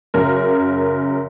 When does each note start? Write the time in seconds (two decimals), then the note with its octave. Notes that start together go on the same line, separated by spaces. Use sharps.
0.14 F#2 C#3 A#4